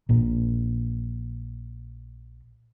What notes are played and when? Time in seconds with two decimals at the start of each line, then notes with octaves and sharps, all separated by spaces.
0.09 A#1 A#2